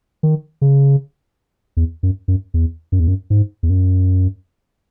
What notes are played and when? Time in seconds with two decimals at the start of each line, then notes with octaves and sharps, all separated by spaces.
0.23 D#3
0.61 C#3
1.77 E2
2.03 F#2
2.28 F#2
2.54 E2
2.92 F#2
3.00 E2
3.07 F#2
3.30 G#2
3.63 E2
3.70 F#2